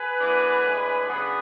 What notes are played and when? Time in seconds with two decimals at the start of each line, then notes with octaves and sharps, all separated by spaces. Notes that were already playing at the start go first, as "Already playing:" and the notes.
Already playing: G#4 B4
0.19 F#2 E3 B3 D4
0.64 A2 G#3 D4
1.06 C#3 F#3 B3 D4 G#4 B4